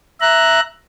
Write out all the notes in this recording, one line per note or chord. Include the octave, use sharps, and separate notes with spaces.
E5 A#5 F#6